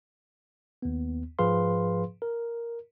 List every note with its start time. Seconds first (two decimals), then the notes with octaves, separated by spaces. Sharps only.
0.82 D#2 B3
1.39 G#2 F3 G#4 B4 F5 C6
2.22 A#4